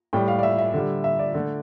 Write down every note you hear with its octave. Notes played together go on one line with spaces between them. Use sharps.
A2 G3 G5
F5
D5
E5
E5
D3 G3
E5
D5
D3 A3